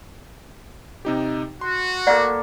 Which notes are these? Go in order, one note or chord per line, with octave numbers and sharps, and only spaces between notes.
C3 D#4 G4
F#4 C6
A#3 A4 D5 F#5